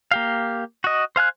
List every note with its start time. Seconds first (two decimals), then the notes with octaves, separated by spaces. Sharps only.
0.11 A#3 G4 F5
0.84 F#4 D#5
1.16 C5 F5 G#5 F#6